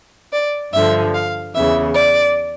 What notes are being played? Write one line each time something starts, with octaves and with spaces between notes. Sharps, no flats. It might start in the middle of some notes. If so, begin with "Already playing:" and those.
D5
G2 D3 F3 E5
F5
E2 C#3 E3 E5
D5